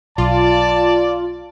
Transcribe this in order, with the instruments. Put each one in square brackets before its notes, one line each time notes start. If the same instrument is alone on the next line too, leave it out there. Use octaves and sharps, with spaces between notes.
[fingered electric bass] B1 [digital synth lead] F4 [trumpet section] D5 [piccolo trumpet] A5